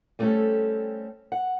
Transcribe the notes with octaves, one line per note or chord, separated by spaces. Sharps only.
G3 A3 C4 C#4 G4 A4
F#5